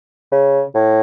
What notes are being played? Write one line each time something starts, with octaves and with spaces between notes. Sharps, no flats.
C#3
A2